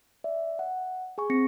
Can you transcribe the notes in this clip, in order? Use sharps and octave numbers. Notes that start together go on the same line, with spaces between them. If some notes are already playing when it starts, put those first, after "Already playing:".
D5 E5
F#5
G#4 G#5 C#6
C4 A#6 C#7